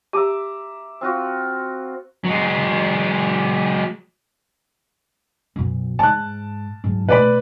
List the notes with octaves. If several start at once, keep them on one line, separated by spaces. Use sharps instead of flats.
G4 E5 A#5 D6
C4 F4 F#4
F#3 G#3
B1 F#2
G#2 A5 F#6
G#2 F#3
B2 A3 B4 D5 B5